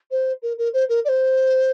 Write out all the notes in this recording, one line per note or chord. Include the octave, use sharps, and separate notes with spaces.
C5
A#4
A#4
C5
A#4
D5
C5